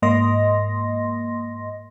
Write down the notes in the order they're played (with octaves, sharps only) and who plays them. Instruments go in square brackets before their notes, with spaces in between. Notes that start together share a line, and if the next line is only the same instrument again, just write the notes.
[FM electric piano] G#2 A#3 D#5 C6 A#6